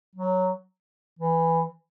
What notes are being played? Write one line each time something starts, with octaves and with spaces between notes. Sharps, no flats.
F#3
E3